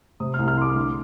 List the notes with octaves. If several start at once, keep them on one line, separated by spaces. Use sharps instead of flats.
C3 D#6
F6
C2
F6
C2 C6 D6
D3